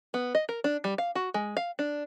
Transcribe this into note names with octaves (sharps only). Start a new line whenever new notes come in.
B3
D#5
A#4
D4
G3
F5
F#4
G#3
F5
D4